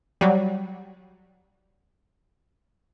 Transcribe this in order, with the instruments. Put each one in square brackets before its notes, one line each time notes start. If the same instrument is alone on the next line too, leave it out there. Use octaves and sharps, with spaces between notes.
[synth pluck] F#3 G3